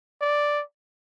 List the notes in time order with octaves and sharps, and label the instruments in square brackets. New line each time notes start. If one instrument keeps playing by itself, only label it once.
[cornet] D5